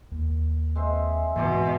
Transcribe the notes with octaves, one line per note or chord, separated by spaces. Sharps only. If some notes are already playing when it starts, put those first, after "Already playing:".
D#2
G#3 C4 E5
G#2 B2 E3 C5 G#5